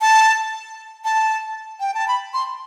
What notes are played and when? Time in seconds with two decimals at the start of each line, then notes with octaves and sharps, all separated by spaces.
0.01 A5
1.05 A5
1.80 G5
1.95 A5
2.08 B5
2.34 C6